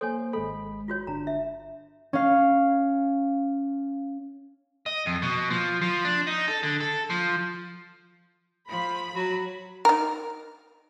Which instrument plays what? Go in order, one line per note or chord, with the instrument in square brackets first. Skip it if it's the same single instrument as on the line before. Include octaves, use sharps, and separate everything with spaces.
[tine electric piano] A#3 C5 [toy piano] A4 C#5 G#5
[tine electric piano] G#1 G#3 B5 [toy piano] A4
[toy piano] F4 F#4 C#5
[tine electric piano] G1 D4 [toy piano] A#5
[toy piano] E5
[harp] C#4 F5
[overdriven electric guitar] D#5
F2
B2
F3
F3
D4
D#4
A4
D3
A4
F3
[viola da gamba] F3 [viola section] B5
[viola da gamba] F#3 F#4
[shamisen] D#4 A#4